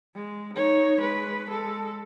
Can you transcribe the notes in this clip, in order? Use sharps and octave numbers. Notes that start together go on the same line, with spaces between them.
G#3
D#4 C#5
G#3 B4
G#3 A4